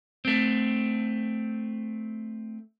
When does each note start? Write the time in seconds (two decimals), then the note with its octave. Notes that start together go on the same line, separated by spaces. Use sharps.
0.25 A3 C4